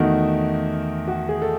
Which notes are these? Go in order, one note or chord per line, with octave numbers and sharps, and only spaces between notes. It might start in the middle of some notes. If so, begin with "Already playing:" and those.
Already playing: E2 D#3 A3 F#4
F#4
G#4
A4